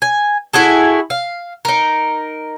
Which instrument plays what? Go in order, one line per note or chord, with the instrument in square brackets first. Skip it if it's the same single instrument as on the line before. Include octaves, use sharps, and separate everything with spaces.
[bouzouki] G#5
E4 F#4 G#4 A4
F5
D#4 A#4